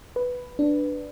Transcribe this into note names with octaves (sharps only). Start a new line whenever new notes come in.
B4
D4